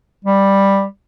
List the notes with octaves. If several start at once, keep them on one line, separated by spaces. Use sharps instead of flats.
G3